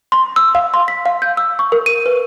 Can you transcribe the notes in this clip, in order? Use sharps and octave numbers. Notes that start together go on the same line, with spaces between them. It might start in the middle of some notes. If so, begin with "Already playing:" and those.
C6
E6
F5
C6
B6
F5
G6
E6
C#6
A#4
D#7
B4